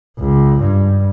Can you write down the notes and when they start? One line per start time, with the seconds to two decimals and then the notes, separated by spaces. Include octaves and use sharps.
0.19 C#2
0.60 G2